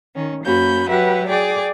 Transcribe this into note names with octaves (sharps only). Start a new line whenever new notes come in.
D#3 C#4
F#2 A#3 C#4 F#4 B5 G6
F#3 F#4 G4 B4 E5 F#5
G#4 D5 G5 D6